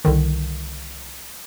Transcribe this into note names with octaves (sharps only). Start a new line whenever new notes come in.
C2 D3 D#3